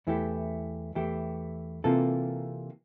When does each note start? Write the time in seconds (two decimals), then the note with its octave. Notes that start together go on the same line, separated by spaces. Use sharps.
0.07 E2 E3 A3 E4 G4
0.95 E2 E3 A3 E4 G4
1.84 C3 E3 A#3 F4 A4